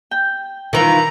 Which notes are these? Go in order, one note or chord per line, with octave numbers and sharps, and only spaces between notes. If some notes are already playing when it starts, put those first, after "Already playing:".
G5
D#3 E3 F4 A#5